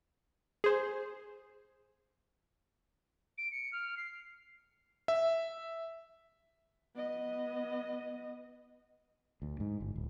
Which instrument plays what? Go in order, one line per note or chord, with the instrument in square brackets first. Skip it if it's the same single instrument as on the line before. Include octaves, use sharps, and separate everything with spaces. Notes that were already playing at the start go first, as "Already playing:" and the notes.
[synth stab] G#4 C5
[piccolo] D7
C#7
F6
C7
[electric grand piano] E5
[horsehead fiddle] B3 D#5
[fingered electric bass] D2
G#2
G1
D1